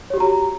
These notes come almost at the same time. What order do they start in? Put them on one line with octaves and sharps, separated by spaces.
C#5 G4 F#4 A#5